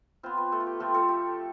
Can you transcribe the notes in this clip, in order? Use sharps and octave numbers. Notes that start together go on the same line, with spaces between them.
B3 C4 F4 C5
B3 B4
A3 A4
F4
G4
F3 A3 C4 F4 A4
A3 A4
G4